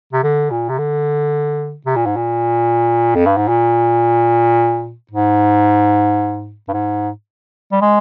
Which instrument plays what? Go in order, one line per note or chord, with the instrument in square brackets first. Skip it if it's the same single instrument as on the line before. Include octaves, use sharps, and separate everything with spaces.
[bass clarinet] C3
D3
A#2
C3
D3
C3
A#2
G#2
A#2
F2
G2
G#2
A#2
G#2
G2
G#2
G3
G#3